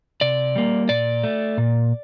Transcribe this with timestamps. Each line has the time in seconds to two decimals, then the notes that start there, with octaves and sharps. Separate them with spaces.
0.21 C3 D5
0.56 G3 A#3
0.89 A#2 D5
1.24 A3
1.58 A#2